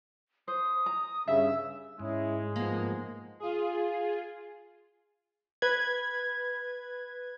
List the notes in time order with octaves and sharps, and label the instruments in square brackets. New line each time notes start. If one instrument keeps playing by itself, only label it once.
[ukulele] C5 [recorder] D#6
[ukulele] A#5
[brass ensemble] G2 C#3 [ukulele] E5 [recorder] E6
[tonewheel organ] G#2 [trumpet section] G#3 [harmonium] C#4 E4
[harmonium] F3 B3 [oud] A#3
[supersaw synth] F4 G#4
[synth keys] B4 G#6